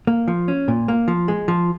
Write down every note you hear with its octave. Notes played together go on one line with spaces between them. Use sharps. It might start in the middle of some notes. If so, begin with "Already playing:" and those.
A#3
F3
C#4
A#2
A#3
F3
G#3
F3